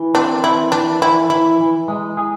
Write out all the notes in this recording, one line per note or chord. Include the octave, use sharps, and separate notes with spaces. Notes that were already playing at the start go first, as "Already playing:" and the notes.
Already playing: E3
C4 D4
E3 E4
E3 D4
E3 E4
E3 E4
E3
G#3
G#4